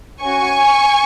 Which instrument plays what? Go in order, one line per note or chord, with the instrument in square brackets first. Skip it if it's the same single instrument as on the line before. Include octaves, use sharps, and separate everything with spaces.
[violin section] C#4 F#4 G#5 C#6